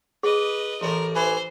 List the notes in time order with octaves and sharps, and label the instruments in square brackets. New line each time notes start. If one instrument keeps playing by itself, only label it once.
[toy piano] G#4 [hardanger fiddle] B4 D#5
[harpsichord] A1 A2 [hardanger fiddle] A#4
[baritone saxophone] E3 [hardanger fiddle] C5